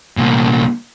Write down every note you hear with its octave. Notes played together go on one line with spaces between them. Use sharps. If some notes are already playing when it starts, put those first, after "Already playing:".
C2 A#2